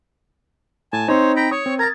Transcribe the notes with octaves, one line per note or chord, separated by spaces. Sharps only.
A2 G#5 A5
C4 D#4 C5 C#5
G5 A#5 B5
C#5 C#6 D#6
C4
A#4 A#5 G#6 A6